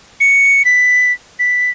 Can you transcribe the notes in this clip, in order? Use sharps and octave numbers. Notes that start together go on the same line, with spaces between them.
C#7
B6
B6